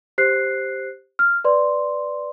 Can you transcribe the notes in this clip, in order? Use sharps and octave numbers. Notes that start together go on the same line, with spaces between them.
G4 C5 F#6 C7
F6
B4 D5 C6